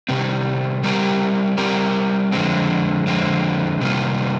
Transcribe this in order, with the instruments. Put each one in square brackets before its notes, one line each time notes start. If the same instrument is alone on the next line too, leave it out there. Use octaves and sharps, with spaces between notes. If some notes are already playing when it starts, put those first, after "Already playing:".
[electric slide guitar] C3 D#3 G3 C4
G3 C4 G4 A#4
G3 C4 G4 A#4
F2 D3 G#3 C4
F2 D3 G#3 C4
C3 D#3 G3 A#3 F4